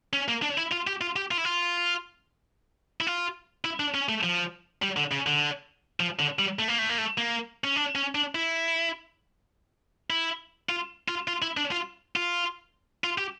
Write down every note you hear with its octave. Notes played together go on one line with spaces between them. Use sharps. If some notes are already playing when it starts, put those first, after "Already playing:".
C#4
A#3
D4
E4
F4
G4
F4
G4
F4
E4
F4
E4
F4
E4
D4
C#4
A3
F3
G3
D3
C#3
D3
F3
D3
G3
A3
A#3
A3
A#3
A3
A#3
C#4
D4
C#4
D4
E4
E4
F4
F4
F4
E4
D4
F4
F4
F4
G4